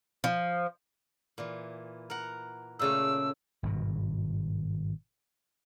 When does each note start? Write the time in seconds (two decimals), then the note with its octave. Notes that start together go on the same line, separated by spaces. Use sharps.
0.24 F3
1.38 A#2 E3
2.10 A#4 F#5
2.79 A#2 C#3 A3 E6
3.63 G#1 G2 B2